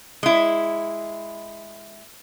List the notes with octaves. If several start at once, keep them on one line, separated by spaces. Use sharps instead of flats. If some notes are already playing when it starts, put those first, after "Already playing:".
G#3 E4